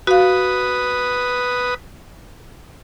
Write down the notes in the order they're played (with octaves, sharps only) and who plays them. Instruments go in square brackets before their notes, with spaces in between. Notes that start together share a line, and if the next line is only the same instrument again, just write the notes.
[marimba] F#4 F5 [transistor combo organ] B4 D#6